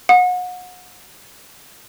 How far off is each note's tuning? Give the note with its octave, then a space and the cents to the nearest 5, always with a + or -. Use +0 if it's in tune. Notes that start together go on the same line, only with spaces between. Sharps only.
F#5 -35